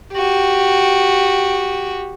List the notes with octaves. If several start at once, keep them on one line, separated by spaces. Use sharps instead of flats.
F#4 G4